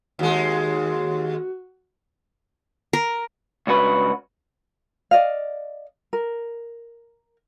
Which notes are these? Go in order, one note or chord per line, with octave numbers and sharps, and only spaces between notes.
D#2 G#3 F#4
A#4
C#2 G2 F#4 B4
D5 D#5 F5
A#4